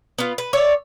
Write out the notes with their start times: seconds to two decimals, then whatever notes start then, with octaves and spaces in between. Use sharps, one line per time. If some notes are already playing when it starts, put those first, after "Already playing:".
0.18 B3 F4
0.38 B4
0.53 C#5 D5 E5